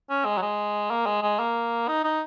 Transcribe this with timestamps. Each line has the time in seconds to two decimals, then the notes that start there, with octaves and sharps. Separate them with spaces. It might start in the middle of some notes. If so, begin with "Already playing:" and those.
0.10 C#4
0.25 G#3
0.37 F#3
0.42 G#3
0.91 A#3
1.06 G#3
1.22 G#3
1.39 A#3
1.88 D#4
2.04 D#4